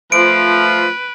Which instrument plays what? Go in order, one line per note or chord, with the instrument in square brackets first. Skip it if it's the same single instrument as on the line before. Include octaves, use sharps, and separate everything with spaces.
[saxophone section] F3 [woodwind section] A3 F4 [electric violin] B4 [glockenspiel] D7